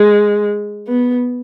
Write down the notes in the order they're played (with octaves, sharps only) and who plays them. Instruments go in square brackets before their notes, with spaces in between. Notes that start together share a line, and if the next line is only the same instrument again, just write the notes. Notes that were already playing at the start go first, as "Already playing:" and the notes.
Already playing: [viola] G#3
B3